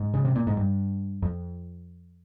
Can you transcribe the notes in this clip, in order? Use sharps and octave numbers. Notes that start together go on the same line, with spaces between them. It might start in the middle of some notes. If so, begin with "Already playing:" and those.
Already playing: G#2
C#3
C3
A#2
G#2
G2
F2